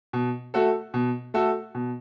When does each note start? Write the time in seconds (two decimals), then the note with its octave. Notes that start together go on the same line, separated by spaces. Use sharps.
0.13 B2
0.54 A3 F#4 A4
0.94 B2
1.34 A3 F#4 A4
1.75 B2